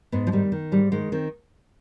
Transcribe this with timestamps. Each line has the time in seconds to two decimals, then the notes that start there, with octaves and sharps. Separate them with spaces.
0.12 G#2 B3
0.27 F3
0.32 D#3 G3
0.52 D#3
0.72 G#2 G3
0.92 D#3 G#3
1.12 D#3 C4